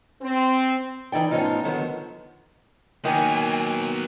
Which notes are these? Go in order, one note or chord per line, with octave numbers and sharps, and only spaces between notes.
C4
E3 D#4 D5 G5
A2 F3 B3 C#4 D#4 F4
D3 D#3 F3 F#3 B3
D#3 F#3 A#3 B3 G#5